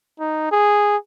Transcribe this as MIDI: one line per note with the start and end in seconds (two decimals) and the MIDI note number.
0.20 0.49 63
0.52 0.97 68